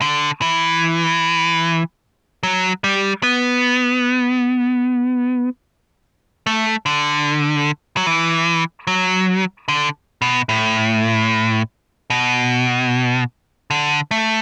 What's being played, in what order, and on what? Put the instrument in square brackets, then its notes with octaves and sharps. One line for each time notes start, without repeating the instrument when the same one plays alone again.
[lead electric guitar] D3
E3
F#3
G3
B3
A3
D3
F#3
E3
F#3
D3
B2
A2
B2
D3
A3